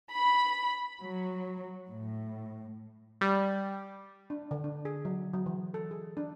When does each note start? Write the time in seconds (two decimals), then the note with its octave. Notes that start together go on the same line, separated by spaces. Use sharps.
0.12 B5
1.00 F#3
1.88 A2
3.21 G3
4.30 D4
4.51 D3
4.64 D4
4.85 G#4
5.05 F#3
5.33 F#3
5.46 E3
5.74 A4
5.91 G#4
6.17 D4